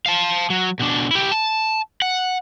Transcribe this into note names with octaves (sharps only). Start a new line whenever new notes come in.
F5 A5
F#3
B2 D4
E4 G4
A5
F#5